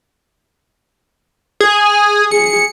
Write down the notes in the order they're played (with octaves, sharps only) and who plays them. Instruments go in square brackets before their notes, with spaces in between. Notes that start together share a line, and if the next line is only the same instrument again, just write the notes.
[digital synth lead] G#4
[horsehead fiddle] G#4 [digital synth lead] C#7